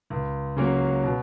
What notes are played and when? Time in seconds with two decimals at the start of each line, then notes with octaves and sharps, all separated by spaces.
0.10 C#2
0.56 C#3 F#3 A#3 C#4
1.03 B2